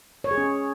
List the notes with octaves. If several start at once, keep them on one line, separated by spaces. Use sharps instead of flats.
C#5
G#4
C#4